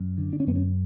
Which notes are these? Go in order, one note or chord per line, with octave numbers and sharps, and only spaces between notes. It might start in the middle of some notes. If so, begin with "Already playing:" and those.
Already playing: F#2
D3
D4
C#4
F#2 B3
C#4